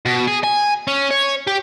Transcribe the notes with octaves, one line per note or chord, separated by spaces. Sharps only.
B2
G#4
G#5
C#4
C#5
G4